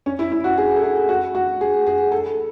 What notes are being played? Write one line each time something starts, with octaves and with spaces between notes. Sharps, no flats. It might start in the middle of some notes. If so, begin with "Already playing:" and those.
C#4
E4
E4
F#4
G#4
A4
G#4
F#4
F#4
G#4
G#4
A4